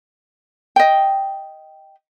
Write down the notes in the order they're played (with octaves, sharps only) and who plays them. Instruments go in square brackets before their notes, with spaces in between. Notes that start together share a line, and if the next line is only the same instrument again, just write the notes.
[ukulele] D#5 G5